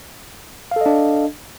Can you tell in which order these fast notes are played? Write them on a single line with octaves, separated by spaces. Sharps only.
F5 A4 D#5 D4